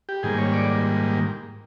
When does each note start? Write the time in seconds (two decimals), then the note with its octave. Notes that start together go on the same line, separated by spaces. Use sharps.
0.09 G4
0.23 G#2 D#3 G3 A#3 G#4
0.38 C#5
0.53 D5